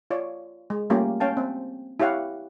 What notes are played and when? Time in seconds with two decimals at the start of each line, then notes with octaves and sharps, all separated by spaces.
0.11 F4 C#5 D5
0.70 G#3
0.90 G3 A3 A#3 C#4 F4 G4
1.20 C#4 C#5 F5 G5 A5
1.37 C4
2.00 E4 G4 C#5 F5 F#5